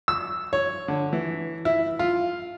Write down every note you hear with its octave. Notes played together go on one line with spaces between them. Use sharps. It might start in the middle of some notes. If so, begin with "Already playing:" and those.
E6
C#5
D3
E3
E4
F4